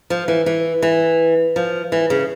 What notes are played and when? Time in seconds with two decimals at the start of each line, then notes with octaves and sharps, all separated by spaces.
0.10 F3
0.28 E3
0.46 E3
0.82 E3
1.56 F3
1.92 E3
2.10 C#3